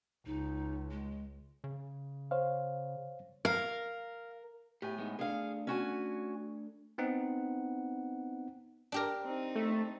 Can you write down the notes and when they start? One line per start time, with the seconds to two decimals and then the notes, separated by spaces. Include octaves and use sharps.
0.26 C#2 D#4
0.91 G#3
1.64 C#3
2.31 C5 C#5 F5
3.45 A#4 F5
4.82 A2 G4 G#5
4.98 G#3 B3 D#4
5.19 A3 D4 G#4 F5
5.67 C#4 F#4 G#5
6.98 B3 C4 D#4 F#5
8.92 D4 G4 A#4
9.23 C4 D#4
9.55 A3